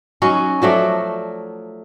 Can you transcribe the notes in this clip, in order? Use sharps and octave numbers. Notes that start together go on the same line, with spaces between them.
F#3 C#4 D#4
F3 F#3 A3 D5